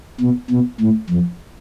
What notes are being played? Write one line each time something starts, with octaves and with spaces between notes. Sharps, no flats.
B2
B2
A2
F2